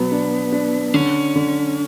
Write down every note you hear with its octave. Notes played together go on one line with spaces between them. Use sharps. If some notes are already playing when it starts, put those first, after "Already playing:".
Already playing: B2 F#3 B3
D4
D4
D3 C#4
D3